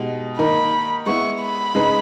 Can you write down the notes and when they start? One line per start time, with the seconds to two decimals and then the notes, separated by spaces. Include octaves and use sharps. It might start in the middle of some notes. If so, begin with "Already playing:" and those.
Already playing: B2 G#3 D#4 G4
0.39 D#3 A#3 D#4 A#4 B5
1.06 G#3 B3 E4 C#6
1.41 B5
1.75 C#3 G#3 D#4 G#4 B4